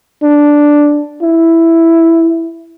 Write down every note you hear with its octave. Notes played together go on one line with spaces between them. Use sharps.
D4
E4